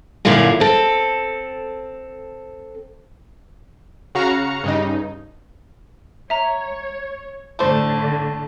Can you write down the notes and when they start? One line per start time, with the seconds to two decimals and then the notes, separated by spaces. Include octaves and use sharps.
0.25 F#2 A#2 D3 E4 F4
0.60 C4 A4
4.15 C#3 F#4 F5 A#5 C#7
4.64 G2 C#3 D#4
6.30 C#5 E5 A#5
7.59 A2 D3 A3 C5